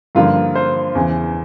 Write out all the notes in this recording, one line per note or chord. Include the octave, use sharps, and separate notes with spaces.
G2 D3 F3 A#3 F4
C5
E2 C#3 E3